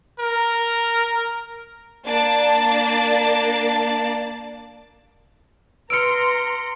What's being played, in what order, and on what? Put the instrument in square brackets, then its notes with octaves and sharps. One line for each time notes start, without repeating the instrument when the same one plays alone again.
[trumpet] A#4
[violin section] A#3 D4 D5 A5
[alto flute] B4 [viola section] A#5 C6 [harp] E6 F6 [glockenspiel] C#7 D7